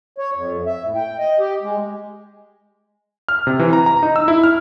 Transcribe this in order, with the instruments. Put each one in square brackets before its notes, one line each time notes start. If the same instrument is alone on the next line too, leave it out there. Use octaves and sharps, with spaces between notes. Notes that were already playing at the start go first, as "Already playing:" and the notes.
[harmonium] C#5
F2
E5
A2
G5
D#5
G4
G#3
[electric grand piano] F6
C3
E3
A#5
A#5
D#4
E6
E4
F6